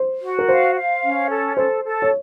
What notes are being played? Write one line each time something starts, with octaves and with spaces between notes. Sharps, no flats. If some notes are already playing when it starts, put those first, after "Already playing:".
Already playing: C5
F#4
A#4
C5 F5
F5
C#4
A4
A4 C5
A4
C#5